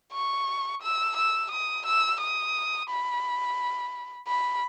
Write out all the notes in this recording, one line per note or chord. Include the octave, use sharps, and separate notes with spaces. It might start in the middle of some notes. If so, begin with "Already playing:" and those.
C#6
E6
E6
D#6
E6
D#6
B5
B5